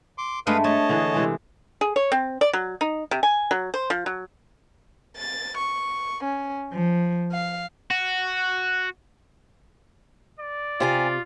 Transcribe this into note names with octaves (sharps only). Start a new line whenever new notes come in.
C6 D6
G2 G#3 A3 B4 F5 D#6
A3 C#5 D#5 A5
D3 E3 G#4
C3 E3 G#3
G#4
C#5
C4
D5
F#3
D#4
C3
G#5
F#3
C5
F3
F#3
A6
C#6
C#4
F3
F5
F#4
D5
C3 C4 F4 G#5 A#5